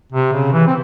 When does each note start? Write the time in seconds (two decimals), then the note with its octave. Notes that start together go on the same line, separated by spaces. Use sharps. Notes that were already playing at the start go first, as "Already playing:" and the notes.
0.12 C3
0.33 C#3
0.53 E3
0.67 C4